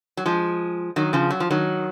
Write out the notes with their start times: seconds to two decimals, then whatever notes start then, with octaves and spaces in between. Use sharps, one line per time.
0.17 F#3
0.26 F3 G#3
0.96 D#3 F#3
1.13 C#3 F3
1.30 F#3
1.40 F3
1.51 D#3 F#3